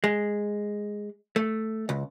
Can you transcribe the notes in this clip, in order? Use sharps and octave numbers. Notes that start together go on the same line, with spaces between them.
G#3
A3
C#2